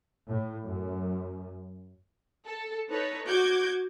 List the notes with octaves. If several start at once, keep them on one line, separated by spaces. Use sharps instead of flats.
A2
F#2
A4
D#4 A4 B4 C#5
F#4 D6 G6 G#6